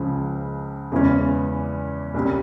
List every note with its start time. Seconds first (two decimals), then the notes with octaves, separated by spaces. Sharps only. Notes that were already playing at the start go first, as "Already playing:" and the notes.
Already playing: C#2 C#3 F3
0.92 E2 C#3 E3 G#3 C#4
2.14 C2 A#2 G3 C#4